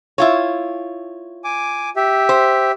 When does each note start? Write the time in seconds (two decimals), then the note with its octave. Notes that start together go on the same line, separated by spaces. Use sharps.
0.18 E4 F4 C#5
1.44 G#5 D6
1.96 G4 E5
2.29 C5